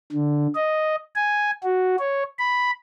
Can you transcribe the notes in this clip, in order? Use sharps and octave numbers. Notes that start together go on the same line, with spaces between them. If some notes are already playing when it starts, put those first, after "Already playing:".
D3
D#5
G#5
F#4
C#5
B5